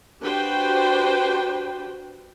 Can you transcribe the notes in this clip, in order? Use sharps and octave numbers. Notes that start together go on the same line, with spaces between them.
D4 F#4 G4 B4 C5 G5